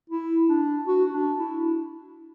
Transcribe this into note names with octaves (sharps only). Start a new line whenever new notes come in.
E4
D4
F#4
D4
E4